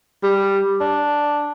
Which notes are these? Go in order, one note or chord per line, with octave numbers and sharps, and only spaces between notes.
G3
D4